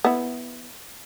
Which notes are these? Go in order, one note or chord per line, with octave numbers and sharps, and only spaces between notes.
B3 E4